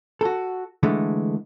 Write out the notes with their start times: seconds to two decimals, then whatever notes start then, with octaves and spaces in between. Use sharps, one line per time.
0.21 F#4 A4
0.83 D3 E3 G#3 A3